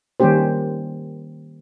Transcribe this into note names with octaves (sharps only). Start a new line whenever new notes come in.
D#3 G3 A#3 C#4 G4 C5